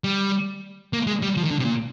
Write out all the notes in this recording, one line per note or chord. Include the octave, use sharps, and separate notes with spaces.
G3
A#3
G#3
G3
F3
D#3
D3
C3
A#2